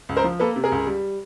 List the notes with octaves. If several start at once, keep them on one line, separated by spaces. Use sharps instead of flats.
C#2
A#4 C5
F3
A#3 A4 B4
C3
G#4 A#4
C#2
G3